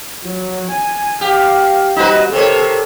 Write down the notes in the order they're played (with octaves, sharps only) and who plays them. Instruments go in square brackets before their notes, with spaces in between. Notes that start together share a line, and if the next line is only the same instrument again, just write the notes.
[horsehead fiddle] F#3
G#5
[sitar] G4 [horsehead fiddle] F5
[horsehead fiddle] G3 [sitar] D#4 F#4 B4
[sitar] C3 C#5 [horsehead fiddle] A4 A#4